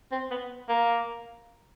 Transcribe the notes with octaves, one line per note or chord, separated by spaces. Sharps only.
C4
B3
A#3